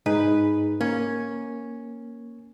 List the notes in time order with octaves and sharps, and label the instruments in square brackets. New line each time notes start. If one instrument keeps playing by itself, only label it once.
[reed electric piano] G#2 D#4 G#4 [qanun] B4
[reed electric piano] A#3 [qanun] C#4